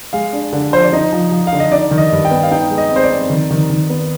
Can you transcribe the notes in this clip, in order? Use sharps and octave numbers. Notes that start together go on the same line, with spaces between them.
G#3 F5
D4
D3
F3 C5
D5
D#4 D#5
F3
F3
F5
D3
D#5
D#4 D5
D#3
D#5
G2
G5
B3
F5
D#4 G5
G#3
D#5
C4 C5
D5
C4
D#3
D#3
D#3
B3